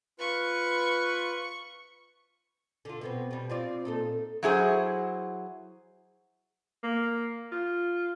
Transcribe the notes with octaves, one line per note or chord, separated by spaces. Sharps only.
F4 B4 B5 C#6
D3 F4
B2 B3 C4
B2 G3
C4 F4 D5
A#2 D#4 A4
F#3 E4 G#4 C5
A#3
F4